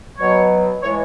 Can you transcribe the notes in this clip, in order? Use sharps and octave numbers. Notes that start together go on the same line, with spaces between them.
B2 F#3 C#5
A2 E3 G#3 C#5